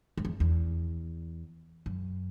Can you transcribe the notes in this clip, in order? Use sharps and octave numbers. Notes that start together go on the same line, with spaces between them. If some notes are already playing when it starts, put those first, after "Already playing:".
F#2
E2
E2
F#2